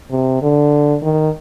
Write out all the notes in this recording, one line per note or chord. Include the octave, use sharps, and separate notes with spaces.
C3
D3
D#3